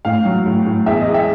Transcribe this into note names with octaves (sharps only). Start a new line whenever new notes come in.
A2 F5
F#3
A2
A2
E2 E5
D#5
G#3
E5